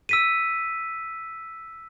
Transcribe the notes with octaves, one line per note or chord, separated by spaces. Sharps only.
E6 B6 D#7